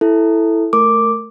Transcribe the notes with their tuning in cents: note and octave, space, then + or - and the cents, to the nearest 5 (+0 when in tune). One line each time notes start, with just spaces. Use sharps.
E4 +0 A4 +0
A3 -10 A#4 -15 D6 +0